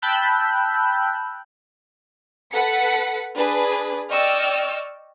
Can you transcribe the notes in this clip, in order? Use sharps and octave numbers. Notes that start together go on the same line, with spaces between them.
G5 A5 B5 E6 F#6 G6
A4 B4 F#5 B6 C#7
D4 G#4 B4
D5 D#5 G5 C#6 E6 F6